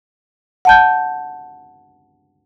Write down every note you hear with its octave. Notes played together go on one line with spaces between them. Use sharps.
F#5 A5 G6